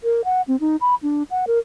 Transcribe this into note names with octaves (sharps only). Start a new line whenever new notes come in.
A#4
F#5
C4
D#4
B5
D4
F#5
A#4